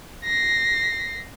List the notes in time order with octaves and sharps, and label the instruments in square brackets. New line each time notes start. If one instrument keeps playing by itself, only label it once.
[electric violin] A#6 C7